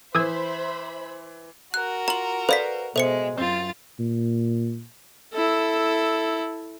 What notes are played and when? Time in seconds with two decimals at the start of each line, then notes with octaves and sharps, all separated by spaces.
0.15 E3 C5 E5 B5 D#6 E6 G#6
1.74 F#4 A#4 F#6
2.08 F4 A#5 F#7
2.49 A4 B4 C5 D5 F5 B6
2.96 B2 G#3 A4 C5 E5 C#7
3.38 F#2 C4 F4 A6
4.00 A#2
5.33 E4 A4